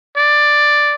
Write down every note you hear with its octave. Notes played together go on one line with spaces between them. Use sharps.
D5